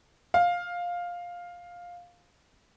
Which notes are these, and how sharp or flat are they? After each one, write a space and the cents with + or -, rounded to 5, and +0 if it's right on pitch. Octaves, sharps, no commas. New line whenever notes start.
F5 +10